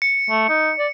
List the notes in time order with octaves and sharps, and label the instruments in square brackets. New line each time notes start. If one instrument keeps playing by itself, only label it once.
[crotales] C#7
[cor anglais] A3
D#4
D5